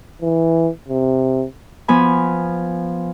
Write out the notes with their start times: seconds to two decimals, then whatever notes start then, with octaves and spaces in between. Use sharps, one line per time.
0.22 E3
0.89 C3
1.88 F3 B3 G#5 B5